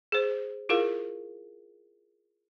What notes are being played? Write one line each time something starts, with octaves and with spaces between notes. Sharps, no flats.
G#4 C5
E4 F4 G#4 A#4 F5